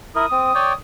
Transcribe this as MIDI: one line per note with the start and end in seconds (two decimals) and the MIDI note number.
0.15 0.26 64
0.15 0.26 70
0.15 0.74 87
0.32 0.52 60
0.55 0.73 73
0.55 0.73 74
0.55 0.73 79